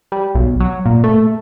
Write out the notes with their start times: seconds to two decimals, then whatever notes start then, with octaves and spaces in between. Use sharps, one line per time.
0.12 G3
0.35 B1
0.60 F#3
0.86 A#2
1.04 A3